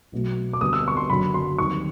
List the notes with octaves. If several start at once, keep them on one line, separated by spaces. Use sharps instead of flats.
B1 B2 F#3 A3
D6
D2 D3 G3 B3 D#6
E6
C#6
C6
F#1 F#2 D3 F#3 B5
C6
D#2 D#3 G3 C4 C#6